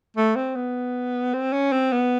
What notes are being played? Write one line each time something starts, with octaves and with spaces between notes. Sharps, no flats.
A3
C4
B3
C4
C#4
C4
B3